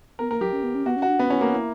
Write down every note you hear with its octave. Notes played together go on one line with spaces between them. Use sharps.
B3 A#4
A#3 A#4
F#3 G4
C#4
B3
C#4
B3 F#4
C#4
F#4
D4
B3 C#4
C#4 E4
A#3 F#4
E4